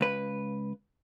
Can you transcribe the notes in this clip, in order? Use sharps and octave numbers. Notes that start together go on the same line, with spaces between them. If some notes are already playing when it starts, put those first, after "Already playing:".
C#2 B4